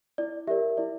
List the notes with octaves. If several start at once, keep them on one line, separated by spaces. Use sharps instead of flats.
E4 D5
G4 A#4 D5 E5
E4 D5